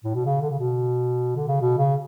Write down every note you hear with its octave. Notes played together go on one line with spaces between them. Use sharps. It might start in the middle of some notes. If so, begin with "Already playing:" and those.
A2
B2
C#3
D3
C#3
B2
D3
C#3
B2
C#3